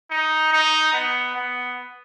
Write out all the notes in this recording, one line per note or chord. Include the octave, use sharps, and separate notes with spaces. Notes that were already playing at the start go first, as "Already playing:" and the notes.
D#4
D#4
B3
B3